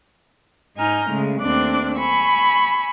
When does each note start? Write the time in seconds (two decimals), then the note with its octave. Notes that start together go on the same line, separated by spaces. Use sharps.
0.76 G#2 D#4 G#5 A#5 F6 G6
1.09 C#3 G#3 A3
1.41 D#2 A3 C4 D4 D6 F#6
1.96 G#5 B5 C#6 E6